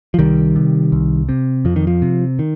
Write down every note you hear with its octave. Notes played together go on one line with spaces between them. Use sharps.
F3
C2 D#3 G3
C3
C2
C3
F2 F3
D#3
F3
C3
D#3